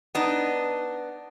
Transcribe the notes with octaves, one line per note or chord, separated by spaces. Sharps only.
B3 D4 D#4